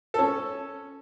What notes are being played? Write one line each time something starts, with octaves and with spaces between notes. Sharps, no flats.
C#4 A4